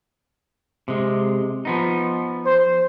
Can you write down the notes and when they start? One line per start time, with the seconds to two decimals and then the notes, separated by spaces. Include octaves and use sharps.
0.88 C3 G#3
1.65 F3 B3 D#4
2.45 C5